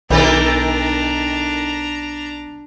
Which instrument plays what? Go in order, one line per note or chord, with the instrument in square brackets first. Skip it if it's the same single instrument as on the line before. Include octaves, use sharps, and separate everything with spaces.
[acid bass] B1 [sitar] D#3 A4 A#4 [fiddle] D4 A#5